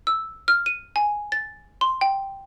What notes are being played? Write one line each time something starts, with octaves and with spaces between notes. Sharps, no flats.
E6
F6
D#7
G#5
A6
C6
G5